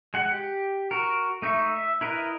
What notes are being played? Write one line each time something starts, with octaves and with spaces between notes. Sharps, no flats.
G#3 F#5
G4
F#4 A#4
A3 D#4 E5 C#6
E5
E4 A#4 B4 D#5